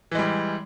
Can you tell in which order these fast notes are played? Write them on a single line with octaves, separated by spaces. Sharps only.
E3 G#3 G3